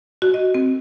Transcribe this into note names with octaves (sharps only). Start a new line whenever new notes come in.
F#4
D#5
C4